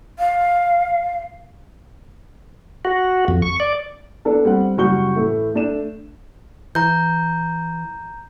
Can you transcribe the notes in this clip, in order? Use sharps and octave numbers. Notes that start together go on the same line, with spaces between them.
F5
F#4
F2
C#6
D5
B3 D4 A4
G3 C4 F#5
F#1 G3 F#4 C#6 G6 G7
A2 E3 A3
A3 D4 E7
E3 A#5 G6